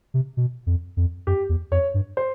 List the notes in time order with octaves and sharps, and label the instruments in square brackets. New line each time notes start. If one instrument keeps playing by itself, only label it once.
[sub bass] C3
B2
F2
F2
[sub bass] F#2 [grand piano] G4
[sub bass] E2
[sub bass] F2 [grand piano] C#5
[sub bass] G2
[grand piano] C5